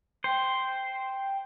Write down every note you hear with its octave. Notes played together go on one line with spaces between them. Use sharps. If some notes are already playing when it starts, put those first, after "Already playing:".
C5 G5